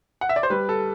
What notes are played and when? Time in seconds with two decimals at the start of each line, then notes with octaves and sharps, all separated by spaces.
0.21 F#5
0.29 E5
0.36 D5
0.43 C5
0.50 G3 B4
0.69 A4